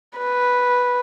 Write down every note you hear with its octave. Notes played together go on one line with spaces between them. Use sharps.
B4